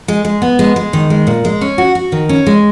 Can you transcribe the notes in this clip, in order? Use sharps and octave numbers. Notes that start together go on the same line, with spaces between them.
G#3
G#3
B3
G#3
G#3
D#3
G#3
A#2
G#3
C#4
F#4
F#4
D#3
C#4
G#3